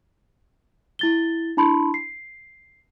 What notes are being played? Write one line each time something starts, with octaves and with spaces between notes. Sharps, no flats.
E4 A6 G7
D4 E4 A5 B5 C6
C7